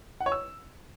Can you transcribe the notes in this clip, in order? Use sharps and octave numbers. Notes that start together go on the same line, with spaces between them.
F#5
C#5
E6